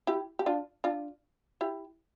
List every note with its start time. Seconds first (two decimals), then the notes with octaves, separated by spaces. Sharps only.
0.07 E4 G4
0.39 G4
0.46 D4 F4
0.84 D4 F4
1.61 E4 G4